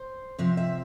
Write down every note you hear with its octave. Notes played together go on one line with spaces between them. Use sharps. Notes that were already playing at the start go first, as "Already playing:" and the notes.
Already playing: C5
C3 F3 C4 E5
E5